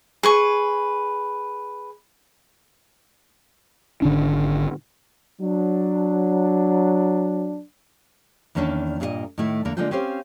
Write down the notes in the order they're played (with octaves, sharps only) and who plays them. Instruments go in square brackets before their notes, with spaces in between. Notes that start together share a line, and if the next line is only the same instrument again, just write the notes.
[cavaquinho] G#4 B4 C#6
[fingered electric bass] G#1 D3 C#4 D4
[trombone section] F#3 D4
[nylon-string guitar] E2 D#3 A#3 C#4 D4 A5
G2 A#2 E4 F4 A#4 D#5
A2 D#3 A3 E4
E2 D3 A#3
D3 G#3 A#3 F4 A4 G5
C4 C#4 G4 C5 F5